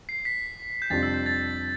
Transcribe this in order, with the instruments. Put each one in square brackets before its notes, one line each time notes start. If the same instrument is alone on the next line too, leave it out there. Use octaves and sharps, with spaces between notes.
[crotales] C7
B6
G6
[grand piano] F2 C3 G3 D4 F4 [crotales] A6
[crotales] E6
G6
A6